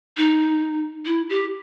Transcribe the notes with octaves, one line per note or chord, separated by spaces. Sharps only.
D#4
E4
G4